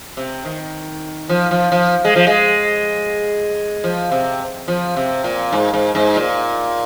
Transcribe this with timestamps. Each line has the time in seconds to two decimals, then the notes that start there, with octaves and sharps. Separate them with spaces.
0.17 C3
0.45 D#3
1.29 F3
1.51 F3
1.72 F3
2.05 G#3
2.16 F3
2.27 G#3
3.84 F3
4.12 C3
4.68 F3
4.97 C3
5.24 A#2
5.53 G#2
5.74 G#2
5.95 G#2
6.16 A#2